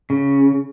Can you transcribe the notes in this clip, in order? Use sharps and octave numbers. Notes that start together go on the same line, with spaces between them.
C#3